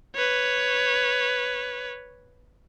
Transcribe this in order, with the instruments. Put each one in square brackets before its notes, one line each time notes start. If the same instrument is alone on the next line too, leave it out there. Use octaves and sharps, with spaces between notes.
[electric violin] B4 C#5